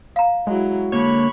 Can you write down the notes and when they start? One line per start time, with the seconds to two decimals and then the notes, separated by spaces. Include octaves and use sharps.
0.16 F5 A#5
0.47 F#3 G#3 E4
0.92 D3 A#3 C#5 B5 C#6